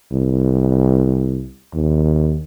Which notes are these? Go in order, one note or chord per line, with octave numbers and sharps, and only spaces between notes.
C2
D#2